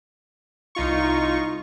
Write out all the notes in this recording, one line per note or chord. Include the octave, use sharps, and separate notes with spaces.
C2 D#4 F4 C#6